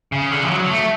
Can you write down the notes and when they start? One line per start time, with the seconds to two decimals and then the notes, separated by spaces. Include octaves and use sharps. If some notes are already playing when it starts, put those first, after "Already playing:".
0.12 C#3
0.31 D3
0.44 F3
0.51 F#3
0.70 A3